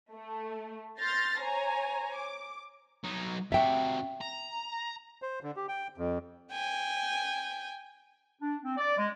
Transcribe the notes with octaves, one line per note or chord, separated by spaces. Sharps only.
A3
C6 F6 G6 A6 A#6 C7
C5 C#5 G#5 A#5
D6
F#3 D#4
C3 F#4 E5 G5
A#5
C5
D3
G4
G5
F2
G5 G#5
D4
C4
D5
G#3